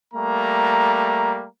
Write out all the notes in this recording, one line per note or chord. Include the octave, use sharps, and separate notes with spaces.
G3 A3 A#3 A#5